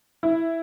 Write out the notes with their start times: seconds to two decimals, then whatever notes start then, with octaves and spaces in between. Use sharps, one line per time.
0.23 E4